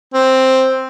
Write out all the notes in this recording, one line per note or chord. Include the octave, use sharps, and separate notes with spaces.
C4